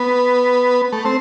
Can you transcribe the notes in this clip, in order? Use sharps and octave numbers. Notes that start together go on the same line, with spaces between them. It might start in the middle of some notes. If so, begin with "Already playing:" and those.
Already playing: B3
A3
C4